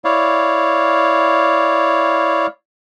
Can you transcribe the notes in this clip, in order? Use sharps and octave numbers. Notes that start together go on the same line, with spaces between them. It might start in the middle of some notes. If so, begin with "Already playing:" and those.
E4 C#5 D5 F5